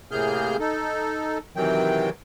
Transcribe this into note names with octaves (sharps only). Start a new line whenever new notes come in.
A2 C3 A#3 G#4 F6 G6
D#4 A4
C3 D#3 E3 F#3 G5